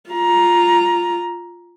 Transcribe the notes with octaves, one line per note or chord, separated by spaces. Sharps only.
F4 A#5